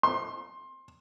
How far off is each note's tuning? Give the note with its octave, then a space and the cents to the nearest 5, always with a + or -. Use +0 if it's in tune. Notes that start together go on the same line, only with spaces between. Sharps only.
C6 +20